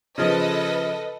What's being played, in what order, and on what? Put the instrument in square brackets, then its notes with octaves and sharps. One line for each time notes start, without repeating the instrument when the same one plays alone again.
[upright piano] C#3 F3 [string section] A4 B4 D#5